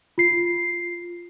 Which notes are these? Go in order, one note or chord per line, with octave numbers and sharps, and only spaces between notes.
F4 C7